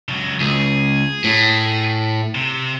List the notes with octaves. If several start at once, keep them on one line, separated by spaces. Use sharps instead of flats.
C#2 F#3
C#2 G#4
A2
C3